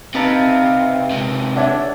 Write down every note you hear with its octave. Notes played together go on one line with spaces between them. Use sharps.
C3 D#4 B4 F5 A5
C3 G#3
D4 C#5 E5 F#5